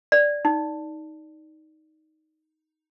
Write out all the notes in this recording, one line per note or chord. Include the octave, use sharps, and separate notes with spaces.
D5
D#4